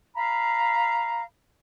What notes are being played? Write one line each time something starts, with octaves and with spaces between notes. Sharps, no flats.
F5 A#5 B5